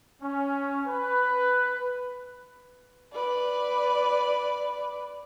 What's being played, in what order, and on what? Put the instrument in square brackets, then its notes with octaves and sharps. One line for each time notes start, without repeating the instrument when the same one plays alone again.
[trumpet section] C#4
B4
[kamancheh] B4 D5